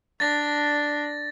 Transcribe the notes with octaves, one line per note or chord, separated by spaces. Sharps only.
D4 A6 A#6